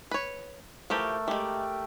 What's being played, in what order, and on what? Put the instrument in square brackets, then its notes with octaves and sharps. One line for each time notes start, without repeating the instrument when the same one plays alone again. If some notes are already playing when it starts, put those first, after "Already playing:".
[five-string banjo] B4 C#5
[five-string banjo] E3 F3 G4 [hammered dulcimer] A3 A#4
[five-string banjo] G#3 A3 [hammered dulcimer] G4